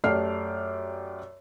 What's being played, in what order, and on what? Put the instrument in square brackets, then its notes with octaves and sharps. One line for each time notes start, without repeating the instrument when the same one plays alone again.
[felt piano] F#2 A3 G4 D5 F6 C7